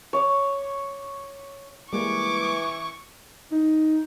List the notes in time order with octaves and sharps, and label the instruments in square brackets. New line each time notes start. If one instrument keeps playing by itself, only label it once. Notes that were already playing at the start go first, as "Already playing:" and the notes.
[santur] C#5 D6
[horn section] E3 [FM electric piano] G3 G#3 A#3 [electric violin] C#6 [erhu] D6
[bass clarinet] D#4